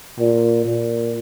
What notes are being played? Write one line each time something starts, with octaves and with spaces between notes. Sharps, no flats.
A#2
A#2